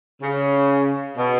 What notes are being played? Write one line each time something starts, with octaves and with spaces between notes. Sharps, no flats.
C#3
B2